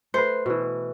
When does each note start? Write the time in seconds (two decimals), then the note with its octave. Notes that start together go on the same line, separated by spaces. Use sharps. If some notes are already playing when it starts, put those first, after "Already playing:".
0.14 A3 B4 C5
0.46 B2 E3